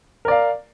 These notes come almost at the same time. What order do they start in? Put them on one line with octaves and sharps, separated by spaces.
A#4 D5 F5